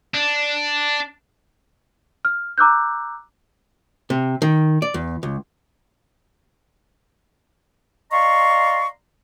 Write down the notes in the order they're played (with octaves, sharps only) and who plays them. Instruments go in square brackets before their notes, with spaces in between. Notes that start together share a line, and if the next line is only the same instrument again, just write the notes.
[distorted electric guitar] D4
[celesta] F6
A#5 D6 E6 F#6 G6
[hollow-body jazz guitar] C3
D#3
D5
E2
C#2
[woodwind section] D5 D#5 F5 A#5 C6 C#6